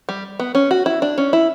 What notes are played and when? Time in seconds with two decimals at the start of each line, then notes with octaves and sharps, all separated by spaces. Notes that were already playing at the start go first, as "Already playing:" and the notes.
0.09 G3
0.40 B3
0.55 C#4
0.71 F#4
0.86 E4
1.02 D4
1.18 C#4
1.33 E4